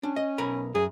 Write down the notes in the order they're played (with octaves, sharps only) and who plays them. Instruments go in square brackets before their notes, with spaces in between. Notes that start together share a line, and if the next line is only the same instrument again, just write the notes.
[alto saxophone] C#4 [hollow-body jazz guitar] D4
[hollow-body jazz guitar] D#5
B1 A#4 B5
[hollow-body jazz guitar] F#2 [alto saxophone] G#4